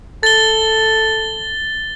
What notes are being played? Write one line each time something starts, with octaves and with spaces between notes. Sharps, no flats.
A4 A6 G7